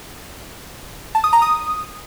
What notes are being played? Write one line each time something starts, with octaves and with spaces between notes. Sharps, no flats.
A5
D#6
A#5
D#6